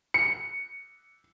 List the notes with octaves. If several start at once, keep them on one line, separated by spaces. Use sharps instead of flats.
C#7